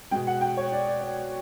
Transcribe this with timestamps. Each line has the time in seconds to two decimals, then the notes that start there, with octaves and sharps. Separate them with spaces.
0.11 B2 G#3 G5
0.27 F#5
0.41 G5
0.57 C#5
0.72 D5
0.87 D5
1.01 D5